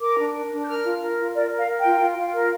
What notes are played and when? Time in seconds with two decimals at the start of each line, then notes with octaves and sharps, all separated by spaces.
0.01 A#4 D6
0.19 D4
0.35 A#4
0.52 D4
0.63 G6
0.68 A#4 F6
0.84 F4
1.02 A#4
1.18 F4
1.34 A#4 D5
1.51 A#4
1.57 F5
1.67 A#4
1.78 G5
1.84 F4
2.00 F4
2.18 F4
2.34 A#4